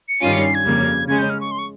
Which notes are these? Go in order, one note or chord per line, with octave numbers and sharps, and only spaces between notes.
C#7
G2 D#3 G3 C#4 F4 D#7
C#7
C7
G#6
F2 C#3 G3 A#3
C#3 G#3 C#4 G#6
G6
F6
C#6
C6
C#6